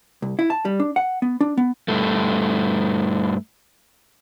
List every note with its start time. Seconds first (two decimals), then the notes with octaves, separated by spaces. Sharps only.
0.22 C2
0.39 E4
0.50 A5
0.65 G3
0.80 D4
0.96 F#5
1.22 B3
1.41 D4
1.58 B3
1.88 G2 A3